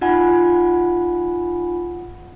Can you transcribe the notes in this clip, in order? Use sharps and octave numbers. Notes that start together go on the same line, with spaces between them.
D#4 F4 F#5 G#5 B5